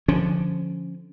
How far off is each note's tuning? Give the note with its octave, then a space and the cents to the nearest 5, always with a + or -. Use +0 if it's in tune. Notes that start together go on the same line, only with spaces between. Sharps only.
D3 +0 F3 +0 C#4 +0